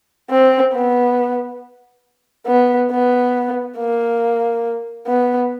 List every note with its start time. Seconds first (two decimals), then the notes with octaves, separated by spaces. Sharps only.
0.30 C4
0.73 B3
2.47 B3
2.91 B3
3.78 A#3
5.07 B3